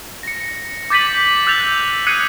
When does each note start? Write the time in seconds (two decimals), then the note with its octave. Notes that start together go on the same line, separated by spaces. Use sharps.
0.23 A#6 C#7
0.90 D6 G6 A6 B6 D#7 F#7
1.47 E6 F#6 G6 A6 F7
2.07 D#6 F#6 G#6 C7 C#7 D#7